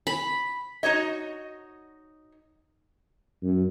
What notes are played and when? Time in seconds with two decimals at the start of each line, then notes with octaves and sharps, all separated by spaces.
0.07 B5
0.83 D#4 F#4 C#5 D#5
3.43 F#2